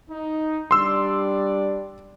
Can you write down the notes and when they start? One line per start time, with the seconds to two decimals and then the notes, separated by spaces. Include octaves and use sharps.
0.10 D#4
0.71 G3 D4 D5 C6 E6